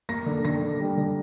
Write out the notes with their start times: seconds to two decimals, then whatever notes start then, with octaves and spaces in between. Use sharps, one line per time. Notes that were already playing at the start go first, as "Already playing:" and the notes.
0.09 A#3 A#6
0.26 D3
0.45 D3 A#6
0.62 D3
0.80 G3
0.97 D3